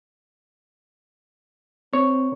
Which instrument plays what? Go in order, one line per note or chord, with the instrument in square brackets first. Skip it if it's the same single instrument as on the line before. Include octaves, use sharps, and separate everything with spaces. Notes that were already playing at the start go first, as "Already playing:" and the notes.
[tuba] C4 [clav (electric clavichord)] C#5